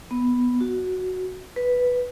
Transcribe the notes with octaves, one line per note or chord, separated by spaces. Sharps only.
B3
F#4
B4